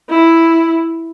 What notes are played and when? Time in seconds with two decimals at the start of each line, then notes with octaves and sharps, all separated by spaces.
0.10 E4